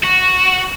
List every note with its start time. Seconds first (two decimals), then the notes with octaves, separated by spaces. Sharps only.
0.03 F#4